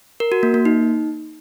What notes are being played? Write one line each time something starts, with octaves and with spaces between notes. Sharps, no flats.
A#4
F#4
A#3
A#3
D#4